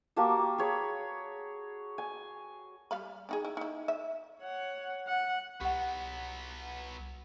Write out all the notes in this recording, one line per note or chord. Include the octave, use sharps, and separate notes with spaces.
A#3 F#4 G4 A5
G#4 C#5 B5
G#5
G3 F5 B5
D4 D#4 G#4
E4
D#4 E4
E5
C#5 F#5
F#5
C2 F#3 B3 G4 F#5